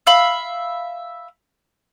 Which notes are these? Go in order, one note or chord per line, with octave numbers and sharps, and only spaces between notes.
E5 F5 B5